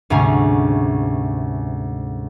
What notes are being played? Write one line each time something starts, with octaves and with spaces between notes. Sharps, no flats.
D2 G#2 C3 C#4 G#4